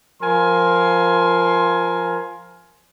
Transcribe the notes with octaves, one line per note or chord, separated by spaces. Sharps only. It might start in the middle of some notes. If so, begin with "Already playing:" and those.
F3 A#4 G#5 C6